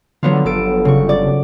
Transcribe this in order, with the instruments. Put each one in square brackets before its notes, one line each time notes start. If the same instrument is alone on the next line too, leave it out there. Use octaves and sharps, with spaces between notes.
[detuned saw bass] D3 [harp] F#3 B3 F4
[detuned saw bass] G1 [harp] A4 D7
[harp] C#3 C#6
D5